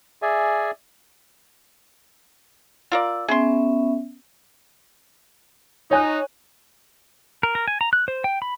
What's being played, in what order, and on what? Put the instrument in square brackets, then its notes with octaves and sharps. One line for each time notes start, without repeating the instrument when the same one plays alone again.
[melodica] G#4 D5 E5 G#5
[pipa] F4 A#4 D5 [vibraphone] E6
[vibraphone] B3 C#4 E5 [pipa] G#4 C6
[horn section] D#4 [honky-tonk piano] C#5 G#5 F#6
[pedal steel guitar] A#4
A#4
G#5
A#5
F#6
C5
G5
B5